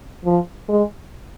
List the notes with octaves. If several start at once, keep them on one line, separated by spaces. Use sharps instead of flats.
F3
G#3